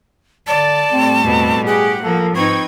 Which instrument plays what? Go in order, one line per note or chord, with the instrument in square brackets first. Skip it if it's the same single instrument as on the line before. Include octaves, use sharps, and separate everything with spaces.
[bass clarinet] D3 [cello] D5 [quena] A5
[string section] A2 G3 A3 [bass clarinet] C4
[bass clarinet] E2 [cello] B2 C4
[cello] G4 [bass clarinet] G#4 [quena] F#5
[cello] F3 A#3 [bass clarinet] A4
[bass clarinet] G#2 [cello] C4 D#4 [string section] B4 G5 G#6 [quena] C#6